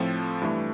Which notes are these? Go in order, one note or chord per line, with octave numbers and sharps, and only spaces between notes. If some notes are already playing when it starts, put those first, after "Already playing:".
Already playing: A2 F3 C4 F4 A4
G2 E3 A3